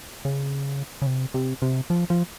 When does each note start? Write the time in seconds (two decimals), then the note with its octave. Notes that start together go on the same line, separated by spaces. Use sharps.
0.25 C#3
1.02 C#3
1.07 C3
1.34 C3
1.62 C3
1.90 F3
2.10 F3